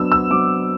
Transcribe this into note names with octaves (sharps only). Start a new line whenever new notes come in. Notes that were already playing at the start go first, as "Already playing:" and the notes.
Already playing: F#3 B3 D4 E6
E6
F#3 B3 D4 D6